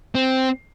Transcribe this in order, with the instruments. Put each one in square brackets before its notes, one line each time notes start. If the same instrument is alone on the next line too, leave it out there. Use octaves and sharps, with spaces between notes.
[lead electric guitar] C4